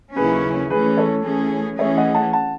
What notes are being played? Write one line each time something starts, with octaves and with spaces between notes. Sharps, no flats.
D#2 C#3 F#3 C#4 E4 G#4 B4
E3 A3 C#4 G#4 B4
A4 C#5
E3 A3 C#4 G#4
E3 A3 C#4 G#4 C#5 E5
D#5 F#5
F#5 A5
F#5 A5